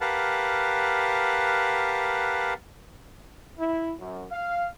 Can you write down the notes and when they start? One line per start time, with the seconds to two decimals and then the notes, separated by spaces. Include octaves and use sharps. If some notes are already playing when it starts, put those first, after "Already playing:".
0.01 G4 A#4 B4 F5 F#5 A5
3.59 E4
3.99 F#2
4.31 F5